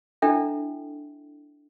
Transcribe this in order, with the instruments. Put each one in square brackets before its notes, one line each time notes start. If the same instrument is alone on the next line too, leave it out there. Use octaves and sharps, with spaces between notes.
[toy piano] D4 E4 A4 E5 G5